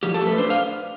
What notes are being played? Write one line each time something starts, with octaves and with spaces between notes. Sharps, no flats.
F3 G4
A4
A3
B4
D4 C5
F5